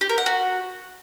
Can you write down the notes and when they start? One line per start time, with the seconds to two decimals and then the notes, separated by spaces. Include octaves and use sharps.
0.01 G4
0.09 A#4
0.18 F#5
0.26 F#4